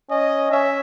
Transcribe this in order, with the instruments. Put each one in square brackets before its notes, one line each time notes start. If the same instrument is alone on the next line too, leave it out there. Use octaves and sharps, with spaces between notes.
[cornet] C#4 [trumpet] D#5
[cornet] C#4 [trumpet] E5